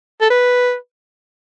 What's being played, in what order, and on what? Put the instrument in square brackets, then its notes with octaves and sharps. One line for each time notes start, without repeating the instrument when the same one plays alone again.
[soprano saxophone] A4
B4